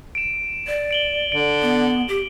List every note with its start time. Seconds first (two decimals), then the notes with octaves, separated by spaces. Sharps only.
0.15 D7 E7
0.67 D5
0.91 D7 F#7 G7
1.32 D3 D7
1.62 B3
2.08 G4